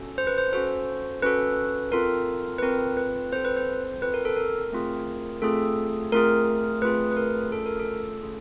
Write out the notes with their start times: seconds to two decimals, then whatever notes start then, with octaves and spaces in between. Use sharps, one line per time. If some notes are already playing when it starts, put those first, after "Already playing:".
Already playing: C#4 F#4 A4
0.18 C5
0.27 B4
0.38 C5
0.53 C#4 F#4 A4 C5
1.23 C#4 F#4 A4 B4
1.92 C4 F4 A4 A#4
2.58 B4
2.62 C4 F4 A4 A#4
2.97 B4
3.32 C4 F4 A4 C5
3.45 B4
3.57 C5
4.02 C4 F4 A4 B4
4.14 A#4
4.25 A4
4.37 A#4
4.72 A3 C4 F4 G#4
5.42 A3 C4 F4 G#4 A4
6.12 A3 C4 F4 G#4 A#4
6.82 A3 C4 F4 G#4 B4
7.11 B4
7.17 A#4
7.52 A3 C#4 F4 G#4 A4
7.66 A#4
7.80 A4
8.22 A3 C#4 F4 G#4